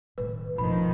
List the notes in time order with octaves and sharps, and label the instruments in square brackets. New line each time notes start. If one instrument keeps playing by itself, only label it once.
[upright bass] A2 D#3 [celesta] B4
[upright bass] F#1 B2 [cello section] D#3 F3 [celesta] B5